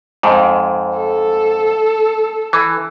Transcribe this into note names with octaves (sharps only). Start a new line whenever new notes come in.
F2 G#2
A4
E3